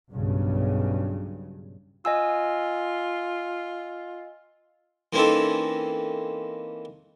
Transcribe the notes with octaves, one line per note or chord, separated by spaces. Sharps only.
B1 G2 C#3
F4 D#5 G#5 E6
E3 A#3 C4 C#4 D#4 A4